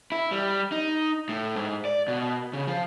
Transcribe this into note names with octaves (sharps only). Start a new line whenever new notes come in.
E4
G3
D#4
A2
G#2
D5
B2
C#3
F3